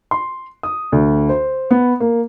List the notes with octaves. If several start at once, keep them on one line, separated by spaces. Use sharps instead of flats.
C6
D#6
D2
C5
B3
A#3